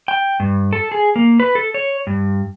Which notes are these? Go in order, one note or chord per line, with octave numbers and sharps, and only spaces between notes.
G5
G2
A4
G#4
A#3
B4
A4
C#5
G2